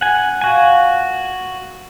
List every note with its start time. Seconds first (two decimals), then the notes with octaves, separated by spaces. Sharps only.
0.01 F#2 F#5 G#5
0.41 A#2 F4 F#4 G#5